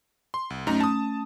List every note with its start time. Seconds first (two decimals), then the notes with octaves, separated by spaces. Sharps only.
0.34 C6
0.50 C2
0.67 F#2 A3 C#4 D#4 A#5
0.80 A5 D#6